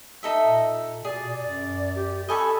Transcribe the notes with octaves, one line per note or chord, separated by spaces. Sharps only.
D#4 A4 E5
A#2
B2 G#4 D5
F#2 D5
G4
A4 D#5 G#5 B5 C#6